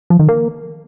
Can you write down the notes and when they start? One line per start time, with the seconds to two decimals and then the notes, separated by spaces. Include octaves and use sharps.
0.10 F3
0.19 D#3
0.29 A#3